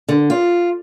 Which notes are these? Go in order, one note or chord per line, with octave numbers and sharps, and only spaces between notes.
D3
F4